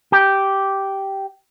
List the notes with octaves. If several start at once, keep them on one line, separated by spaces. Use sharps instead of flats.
G4